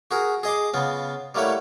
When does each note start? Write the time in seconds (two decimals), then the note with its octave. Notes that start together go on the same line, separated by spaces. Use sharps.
0.11 F#4 G#4 A#4
0.43 G#4 D#5 C6 D6
0.74 C#3 B3 F4
1.35 G3 A3 A#3 E4 C#5 F#5